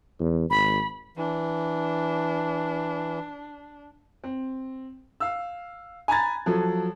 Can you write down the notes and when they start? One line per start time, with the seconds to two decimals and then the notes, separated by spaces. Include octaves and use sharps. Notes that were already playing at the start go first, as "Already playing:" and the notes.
0.21 E2
0.50 G#1 B5
1.17 E3 D4
4.24 C4
5.20 F5 E6
6.08 G#5 A#5 B5 G#6 A6
6.46 F3 F#3 A4